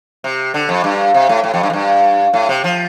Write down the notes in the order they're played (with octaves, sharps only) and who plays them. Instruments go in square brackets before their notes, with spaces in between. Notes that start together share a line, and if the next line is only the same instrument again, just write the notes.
[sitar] C3
D3
F2
G2
C3
A2
A2
F2
G2
F2
G2
A2
C3
F3